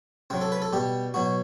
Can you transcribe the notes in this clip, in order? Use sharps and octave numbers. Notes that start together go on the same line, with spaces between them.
C3 F#3 C4
A4
B4
A4
B2 G3 G4
B2 F#3 F#4